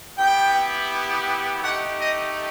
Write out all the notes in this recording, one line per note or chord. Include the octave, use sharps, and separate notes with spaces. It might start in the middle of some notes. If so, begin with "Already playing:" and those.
B3 E4 G4 G5
A3 D#4 G4 F#5
D#5